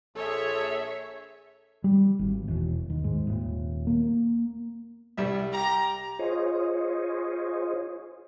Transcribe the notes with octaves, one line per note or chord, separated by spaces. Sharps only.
A#1 G#4 A4 C#5 E5
G3
G#1
E1
D#2
G#2
D#1
A#3
C2 G3 E5
G4 A#5
F4 G#4 C5 C#5 D#5